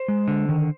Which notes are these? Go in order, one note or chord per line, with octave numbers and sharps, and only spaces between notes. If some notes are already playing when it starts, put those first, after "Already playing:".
Already playing: C5
G#3
D3
D#3